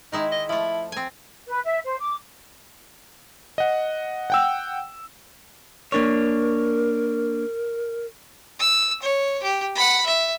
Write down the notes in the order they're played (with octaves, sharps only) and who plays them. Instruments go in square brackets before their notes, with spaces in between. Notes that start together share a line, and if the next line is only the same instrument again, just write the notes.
[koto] D#3 G#3 E4 [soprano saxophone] D#4
[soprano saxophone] D#5
[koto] F3 A3 [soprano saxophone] E4
[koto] C4 G#5
[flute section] B4
E5
C5
D6
[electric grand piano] D#5 F#5
F#5 G5 E6
[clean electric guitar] A#3 D4 C#5 [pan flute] A#4
[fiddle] E6
C#5
G4
F#5 B5
E5